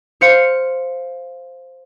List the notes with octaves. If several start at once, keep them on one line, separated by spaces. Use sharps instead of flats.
C5 F5 C#7